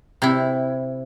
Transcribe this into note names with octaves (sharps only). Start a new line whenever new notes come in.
C3 E4